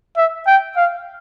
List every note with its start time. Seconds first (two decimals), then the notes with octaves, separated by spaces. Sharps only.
0.17 E5
0.47 G5
0.77 F5